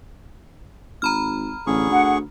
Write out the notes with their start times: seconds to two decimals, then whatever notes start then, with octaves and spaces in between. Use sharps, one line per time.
1.02 G#1 A#5 B5 F6
1.67 A1 D3 G#4 C#6
1.90 D2 F#5